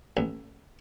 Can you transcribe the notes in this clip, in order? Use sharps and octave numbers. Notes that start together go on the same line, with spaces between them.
A1